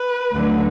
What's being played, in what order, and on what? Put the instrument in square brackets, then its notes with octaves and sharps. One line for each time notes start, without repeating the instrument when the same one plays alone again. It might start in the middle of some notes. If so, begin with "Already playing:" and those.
Already playing: [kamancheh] B4
[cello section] D2 D3 F#3